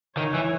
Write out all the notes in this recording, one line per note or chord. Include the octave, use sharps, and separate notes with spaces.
D#3 C#5
E3